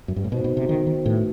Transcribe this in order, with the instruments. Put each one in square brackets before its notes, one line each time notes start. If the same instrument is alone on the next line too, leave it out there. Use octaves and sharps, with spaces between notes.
[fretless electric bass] F#2
G2
A2
[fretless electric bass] B2 [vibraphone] B3 D#4 F#4 C5
[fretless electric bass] B2
C3
D#3
D#3
[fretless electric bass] A2 [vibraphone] A3 D#4 F#4 B4